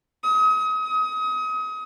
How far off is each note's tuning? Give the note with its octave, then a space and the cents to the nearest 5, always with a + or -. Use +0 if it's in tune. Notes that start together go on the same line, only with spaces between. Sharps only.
D#6 +35
D#6 +30